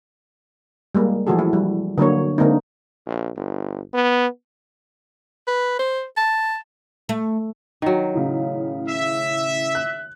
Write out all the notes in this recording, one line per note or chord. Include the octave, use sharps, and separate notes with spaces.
G3 G#3 A#3
E3 F3 A3 F#4 G#4 A4
E4
G3
D3 F#3 A#3 C#5
D3 G#3 A#3 C4 D4 D#4
A#1
G1
B3
B4
C5
A5
A3
D#3 F#3
A2 C#3
E5
F#6